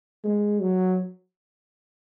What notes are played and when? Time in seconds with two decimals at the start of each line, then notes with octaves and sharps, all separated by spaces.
0.24 G#3
0.60 F#3